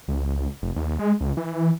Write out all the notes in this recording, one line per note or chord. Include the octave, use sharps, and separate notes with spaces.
C#2
F1
D#2
G#3
C#2
E3